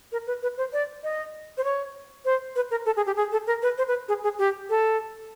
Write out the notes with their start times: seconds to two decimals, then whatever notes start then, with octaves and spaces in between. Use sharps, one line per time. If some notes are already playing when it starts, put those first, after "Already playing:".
0.12 A#4
0.27 B4
0.43 B4
0.58 C5
0.73 D5
1.04 D#5
1.58 C5
1.64 C#5
2.25 C5
2.56 B4
2.71 A#4
2.86 A4
2.97 G#4
3.06 G4
3.17 G#4
3.32 A4
3.47 A#4
3.62 B4
3.78 C5
3.88 B4
4.08 G#4
4.24 G#4
4.39 G4
4.70 A4